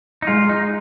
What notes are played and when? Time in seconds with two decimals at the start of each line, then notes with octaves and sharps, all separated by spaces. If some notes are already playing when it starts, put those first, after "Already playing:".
0.22 D#4
0.27 G#3 F4
0.49 D#4